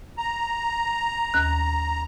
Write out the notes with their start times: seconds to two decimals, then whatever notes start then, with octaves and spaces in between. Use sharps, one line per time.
0.18 A#5
1.34 D#2 F#6